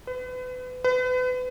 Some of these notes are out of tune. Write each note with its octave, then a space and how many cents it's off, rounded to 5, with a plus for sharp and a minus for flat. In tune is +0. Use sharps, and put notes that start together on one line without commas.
B4 +35
B4 +35